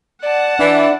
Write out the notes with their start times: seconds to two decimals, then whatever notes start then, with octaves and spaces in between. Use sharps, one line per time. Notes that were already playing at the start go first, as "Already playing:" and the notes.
0.22 D5 F#5 A5
0.59 E3 D4 D5